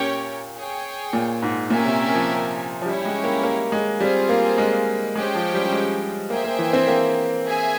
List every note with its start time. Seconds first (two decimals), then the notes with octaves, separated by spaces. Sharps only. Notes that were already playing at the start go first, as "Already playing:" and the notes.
Already playing: A#2 C#4 G4 A#4 C#5 G5
0.56 G#4 C#5 G5
1.13 A#2
1.42 G#2
1.70 A#2 C#4 G4 A#4 E5 G#5
1.85 C3
2.14 F3
2.82 F3
2.86 G3 C#4 E4 G4 C#5
3.05 G#3
3.24 A#3
3.43 A#3
3.72 G#3
4.00 G3 C4 F4 G#4 C5
4.29 A#3
4.58 G#3
5.16 G#3 C#4 G4 C5 G5
5.34 F3
5.54 G3
5.65 G3
5.72 G#3
6.30 A#3 G#4 C5 E5 G5
6.44 A#3
6.59 E3
6.73 C4
6.88 A#3
7.45 G#4 E5 G#5